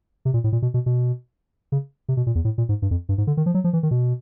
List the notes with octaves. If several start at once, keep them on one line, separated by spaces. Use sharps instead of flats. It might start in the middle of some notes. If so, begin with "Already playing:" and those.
C3
A#2
A2
A#2
B2
B2
B2
C#3
C3
B2
A#2
E2
A2
A#2
G#2
G2
F2
G2
G#2
D3
D#3
F3
F#3
F3
E3
D#3
B2